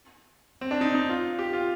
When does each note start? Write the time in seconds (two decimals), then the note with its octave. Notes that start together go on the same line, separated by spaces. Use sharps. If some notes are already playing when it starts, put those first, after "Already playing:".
0.61 C4
0.71 D4
0.81 D#4
0.95 D#4
1.09 F4
1.39 G4
1.53 F4